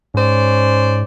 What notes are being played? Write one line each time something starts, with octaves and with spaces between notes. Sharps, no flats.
G#2 C#4 C5 D5